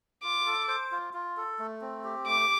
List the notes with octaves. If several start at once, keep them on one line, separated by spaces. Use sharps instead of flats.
F4 D6
A4
C5
F4
F4
A4
A3
C4
G4
A3 D6